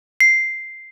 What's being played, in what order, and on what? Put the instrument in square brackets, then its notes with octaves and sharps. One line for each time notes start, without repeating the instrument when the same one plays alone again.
[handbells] C7